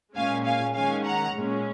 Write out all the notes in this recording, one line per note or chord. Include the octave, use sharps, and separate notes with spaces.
A#2 G#3 C#4 F5 G#5
F5 G#5
D#3 G#3 C#4 F5 G#5
F#5 A#5
A#2 G#3 C#4